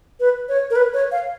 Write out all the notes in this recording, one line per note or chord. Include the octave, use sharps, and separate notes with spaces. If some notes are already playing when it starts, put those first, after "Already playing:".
B4
C#5
A#4
B4
C#5
F5